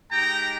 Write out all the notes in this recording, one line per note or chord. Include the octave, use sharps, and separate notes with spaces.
G#3 D#4 G4 G5 A#5